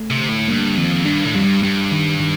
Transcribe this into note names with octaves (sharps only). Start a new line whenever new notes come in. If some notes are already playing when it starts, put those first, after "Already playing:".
Already playing: A3
C3
D3
A2
G2 A#3
F2 D#3
G2 D4
A2
F2 G3
G2
G2 G3
D#3
D#3